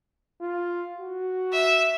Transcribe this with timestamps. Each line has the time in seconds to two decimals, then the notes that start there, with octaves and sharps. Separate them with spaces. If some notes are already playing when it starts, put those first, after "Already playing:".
0.41 F4
0.99 F#4
1.53 E5